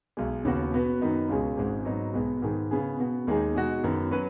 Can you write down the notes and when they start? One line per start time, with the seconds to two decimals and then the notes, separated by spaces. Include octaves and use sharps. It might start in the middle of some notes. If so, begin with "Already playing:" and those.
0.17 B1 B2 G#3
0.45 D#2 C#3 B3 F#4
0.72 B2 B3 F#4 B4
1.01 F#2 D#3 B3 D#4
1.29 C#2 B2 G#3 C#4 G#4
1.57 G#1 G#2 G#3
1.85 G#2 F#3 B3 D#4
2.13 B1 B2 G#3 B3
2.42 G#2 D#3 B3 G#4
2.71 C#3 B3 G#4
2.99 B2 B3 F#4
3.27 D#2 D#3 G#3 D#4 G#4
3.55 B2 G#3 D#4 F#4
3.83 F#2 D#3 B3
4.11 F#3 C#4 B4